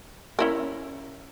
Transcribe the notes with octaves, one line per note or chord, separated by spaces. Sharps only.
C#4 E4 A#4